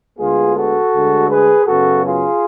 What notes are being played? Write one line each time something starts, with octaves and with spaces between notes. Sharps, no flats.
D2 D3 G#3 B3 F4 G#4
F#4 A4
D2 D3 G#3
G#4 B4
F#2 C#3 F#3 B3 F#4 A4
F4 G#4